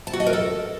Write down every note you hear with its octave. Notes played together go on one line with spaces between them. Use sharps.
A5
F#4
D#5
A#4
A4